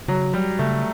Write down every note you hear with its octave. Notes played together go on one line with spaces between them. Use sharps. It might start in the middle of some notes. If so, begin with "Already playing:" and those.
C#3 F#3
F#3 G3
C#3 A3